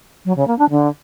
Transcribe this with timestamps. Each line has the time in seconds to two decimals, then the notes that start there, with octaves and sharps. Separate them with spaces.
0.25 F#3
0.36 C#3
0.47 A#3
0.58 D4
0.69 D3